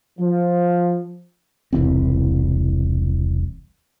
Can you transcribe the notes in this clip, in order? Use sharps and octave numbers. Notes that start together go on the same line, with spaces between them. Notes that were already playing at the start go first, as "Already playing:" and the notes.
F3
E1 C2 E3 C4